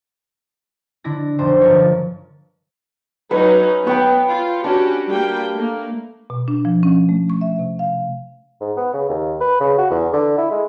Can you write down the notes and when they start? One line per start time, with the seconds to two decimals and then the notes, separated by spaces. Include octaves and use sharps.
1.04 D3 D4 E4 A#6
1.39 F1 B1 D3 C5
1.61 G1 F3 A#4 C#5
1.78 F3
3.31 F#3 C#4 D#4 B4
3.87 B3 C#5 G5 B5
4.29 F4
4.64 C#4 D4 F#4 G4
5.08 G3 A#3 G5
5.55 A3 A#3
6.30 B2
6.48 D4
6.65 F3
6.83 C#4
7.09 A3
7.30 C#6
7.41 E5
7.59 C3
7.79 F5
8.61 G#2
8.77 B3
8.93 C#3
9.09 D#2
9.41 B4
9.60 C#3
9.78 F#4
9.90 E2
10.13 D3
10.38 E4
10.51 G#3